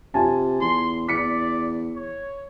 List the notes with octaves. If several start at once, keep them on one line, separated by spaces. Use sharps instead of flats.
C3 F4 G#5 A5
E2 C6
E2 D5 B6 C#7
C#5